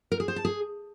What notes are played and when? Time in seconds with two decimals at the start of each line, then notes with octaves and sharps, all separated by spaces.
0.12 A#4
0.20 G#4
0.28 C5
0.36 A5
0.45 G#4